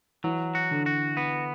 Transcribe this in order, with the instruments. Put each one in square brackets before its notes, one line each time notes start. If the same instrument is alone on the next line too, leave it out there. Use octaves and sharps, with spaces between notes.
[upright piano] E3 [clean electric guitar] F#3
[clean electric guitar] F#4
[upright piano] D3
[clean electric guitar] F#4
B3